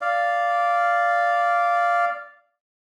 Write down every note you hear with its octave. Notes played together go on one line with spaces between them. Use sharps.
D5 F5